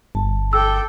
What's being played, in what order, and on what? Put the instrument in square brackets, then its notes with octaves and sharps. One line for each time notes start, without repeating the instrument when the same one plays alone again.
[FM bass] G1 [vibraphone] A5
[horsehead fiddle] A4 G5 [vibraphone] D6 [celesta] E6